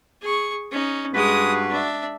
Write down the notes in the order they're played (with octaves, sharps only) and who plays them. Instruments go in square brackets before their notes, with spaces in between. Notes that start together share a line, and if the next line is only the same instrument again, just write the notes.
[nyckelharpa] G#4 C#6
C#4 D#4
[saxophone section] G2 F#4 B4 [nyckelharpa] G#3 D#6
[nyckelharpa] D4 E5